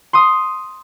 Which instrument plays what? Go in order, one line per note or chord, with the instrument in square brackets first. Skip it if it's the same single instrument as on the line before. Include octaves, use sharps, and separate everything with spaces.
[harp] C6 D#6